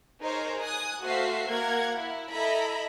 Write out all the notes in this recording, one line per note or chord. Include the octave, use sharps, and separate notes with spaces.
D#4 G#4 A#4 C5 C#5 A#5
G#5 D#6 F#6
A3 F#4 C5 E5 F5 C7
A#3 A#4 F#5 G#6
E4
E4 A4 D#5 E5 A#5 B5